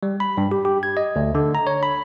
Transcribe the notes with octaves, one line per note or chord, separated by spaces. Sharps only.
G3
B5
G2
G4
G4
G#6
D#5
D2
D3
A#5
C#5
B5